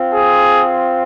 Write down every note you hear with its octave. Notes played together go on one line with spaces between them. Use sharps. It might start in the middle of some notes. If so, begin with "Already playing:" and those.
Already playing: C4 F4
G#4